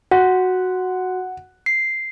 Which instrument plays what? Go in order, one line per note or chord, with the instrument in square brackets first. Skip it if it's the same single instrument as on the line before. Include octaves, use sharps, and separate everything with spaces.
[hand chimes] F#4 [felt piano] F#5
[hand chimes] C7